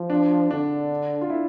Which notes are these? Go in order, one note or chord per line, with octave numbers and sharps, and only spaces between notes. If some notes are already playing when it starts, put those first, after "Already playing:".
Already playing: F3
D4
D3 D4
F4
E4